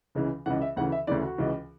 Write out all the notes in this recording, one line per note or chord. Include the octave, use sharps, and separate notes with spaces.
C#2 C#3 E3
C#2 C#3 E3 F#5
E5
D2 C#3 E3 F#5
E5
D2 C#3 E3 D5
F#4
C#2 C#3 E3